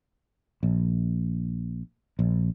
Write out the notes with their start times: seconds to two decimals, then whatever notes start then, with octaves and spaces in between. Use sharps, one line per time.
0.63 A#1
2.19 A#1